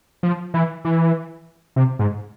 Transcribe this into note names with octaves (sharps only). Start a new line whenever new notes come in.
F3
E3
E3
C3
G#2